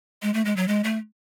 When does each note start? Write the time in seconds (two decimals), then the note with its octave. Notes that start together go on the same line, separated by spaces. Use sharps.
0.22 G#3
0.34 A3
0.45 G#3
0.57 F#3
0.68 G#3
0.84 A3